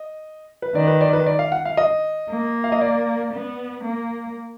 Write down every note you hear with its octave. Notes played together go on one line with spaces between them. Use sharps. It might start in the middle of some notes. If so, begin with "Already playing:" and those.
Already playing: D#5
B4
D#3 D5
B4
D5
B4
D5
F5
F#5
F5
D#5
A#3
F5
D#5
D5
B3
A#3